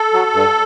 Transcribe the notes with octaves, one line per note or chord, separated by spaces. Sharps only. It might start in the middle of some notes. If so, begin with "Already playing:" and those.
Already playing: A4
F#3
G2